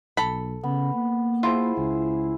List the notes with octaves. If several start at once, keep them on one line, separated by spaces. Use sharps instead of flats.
B1 A4 B5
C#3 B3
A#3
E4 F4 G#4 C5
C#2 G#4